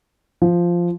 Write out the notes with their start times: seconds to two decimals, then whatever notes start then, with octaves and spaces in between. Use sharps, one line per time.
0.42 F3